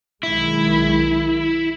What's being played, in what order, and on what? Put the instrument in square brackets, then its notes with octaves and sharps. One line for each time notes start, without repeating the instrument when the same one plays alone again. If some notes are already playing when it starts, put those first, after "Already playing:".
[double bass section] B1 D#3 G#3 [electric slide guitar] E4